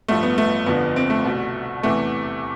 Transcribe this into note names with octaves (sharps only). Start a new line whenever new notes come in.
A1 G2 F3 A3
B3
A3
G1 F2 D3 F3 B3
C4
A3
C2 B2
E2 C3 E3 A3